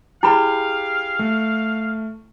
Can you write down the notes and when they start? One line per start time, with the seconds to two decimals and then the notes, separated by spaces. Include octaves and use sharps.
0.23 E4 G4 G#4 F5 B5
1.19 A3